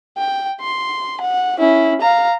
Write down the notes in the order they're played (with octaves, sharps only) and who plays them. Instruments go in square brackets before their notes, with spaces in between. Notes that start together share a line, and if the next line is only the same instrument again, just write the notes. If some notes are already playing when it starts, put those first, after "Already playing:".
[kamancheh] G5
C6
F#5
C#4 E4
F5 A#5